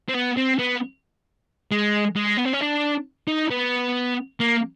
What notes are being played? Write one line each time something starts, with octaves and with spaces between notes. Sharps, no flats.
C4
B3
C4
B3
G#3
G#3
B3
C4
C#4
D4
D#4
B3
A#3